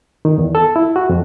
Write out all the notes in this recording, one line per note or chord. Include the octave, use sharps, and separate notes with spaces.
D#3
E2
A4
E4
F#4
F2